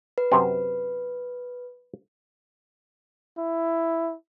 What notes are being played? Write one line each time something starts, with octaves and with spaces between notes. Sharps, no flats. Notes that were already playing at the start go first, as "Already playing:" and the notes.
B4
F#2 C3 C4
E4